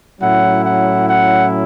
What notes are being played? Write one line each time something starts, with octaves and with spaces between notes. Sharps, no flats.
A2 F#3 C#4 E4 F#5
F#5
F#5